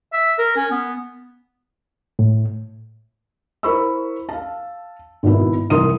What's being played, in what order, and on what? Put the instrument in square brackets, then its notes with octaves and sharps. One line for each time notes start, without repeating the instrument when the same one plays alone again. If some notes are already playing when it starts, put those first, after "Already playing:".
[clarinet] E5
A#4
C#4
B3
[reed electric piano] A2
[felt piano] E4 A#4 C5 B5 C#6 E6
F5 A5
G#1 B2 B3 E4
C2 E3 A#4 C6 D#6 D#7